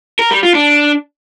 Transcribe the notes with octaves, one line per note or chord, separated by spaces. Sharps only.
A#4
G3
F4
D4